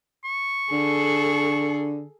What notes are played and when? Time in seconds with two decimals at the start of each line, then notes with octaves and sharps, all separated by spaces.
0.25 C#6
0.72 D3 G#4 A4